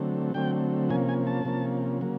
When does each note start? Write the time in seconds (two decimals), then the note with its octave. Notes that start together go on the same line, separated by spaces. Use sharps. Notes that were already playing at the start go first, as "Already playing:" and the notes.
Already playing: D3 F#3 A3 C4
0.34 D3 F#3 A3 C4 G5
0.90 C3 F3 A#3 C#4 G#5
1.09 G#5
1.27 A5
1.45 C3 F3 A#3 C#4
2.01 C#3 F#3 A#3